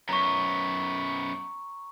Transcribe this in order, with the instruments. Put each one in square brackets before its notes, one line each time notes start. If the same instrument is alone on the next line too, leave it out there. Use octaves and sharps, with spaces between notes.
[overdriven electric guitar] F#2 B3 [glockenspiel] A#5 C#6